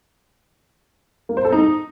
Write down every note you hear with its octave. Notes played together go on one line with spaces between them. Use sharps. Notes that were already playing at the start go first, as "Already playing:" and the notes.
A#3
C5
A4
D#4